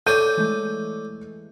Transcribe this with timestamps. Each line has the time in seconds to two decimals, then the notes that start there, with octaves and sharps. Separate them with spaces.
0.07 A4 C#5 D5 G6 D#7
0.37 E3 G#3 A3